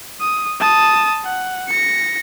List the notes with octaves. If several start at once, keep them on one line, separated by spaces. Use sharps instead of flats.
D#6
A5 D#6
F#5
A#6 C#7